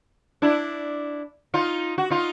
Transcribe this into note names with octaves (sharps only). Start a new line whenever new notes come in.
D4 E4
D#4 F4
F#4
D#4 F4